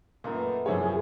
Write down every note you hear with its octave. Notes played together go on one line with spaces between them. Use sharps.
F#2 A#2 A3 B3 D#4
F#2 A2 C3 F3 G#4 C#5